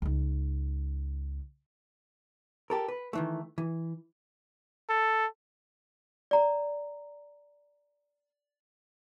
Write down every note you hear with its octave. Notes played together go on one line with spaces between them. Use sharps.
C#2 D#4
G4 A4 A#4
B4
D#3 E3 A3
E3
A4
D5 A#5